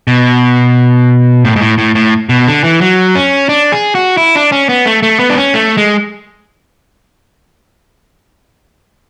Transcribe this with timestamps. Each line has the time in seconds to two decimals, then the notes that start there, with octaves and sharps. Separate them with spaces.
0.07 B2
1.45 A2
1.56 G#2
1.61 A2
1.78 A2
1.95 A2
2.29 B2
2.47 D3
2.64 E3
2.81 F#3
3.15 C#4
3.49 D4
3.72 G#4
3.95 F#4
4.17 E4
4.35 D4
4.52 C#4
4.69 B3
4.86 A3
5.03 A3
5.19 B3
5.30 D4
5.37 C#4
5.54 A3
5.77 G#3